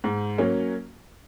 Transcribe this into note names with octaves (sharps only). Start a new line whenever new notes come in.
G#2
F#3 A#3 C#4